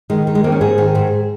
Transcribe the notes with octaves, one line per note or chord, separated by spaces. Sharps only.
D#3 G#3
D#3
G#3
F2 A#3
C#4
G#2 G#4
D#3
G#2 G#4